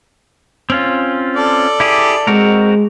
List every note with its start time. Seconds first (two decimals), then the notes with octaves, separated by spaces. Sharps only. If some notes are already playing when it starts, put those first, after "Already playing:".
0.70 C4 C#4 F4
1.36 A4 D5
1.80 E4 G4 G#4
2.27 G#3 C4 F#4 A#4